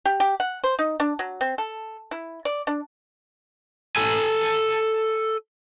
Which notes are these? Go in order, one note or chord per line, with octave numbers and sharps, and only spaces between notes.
G4
G4
F#5
C5
D#4
D4
F#3
C4
A4
E4
D5
D4
A4 G#5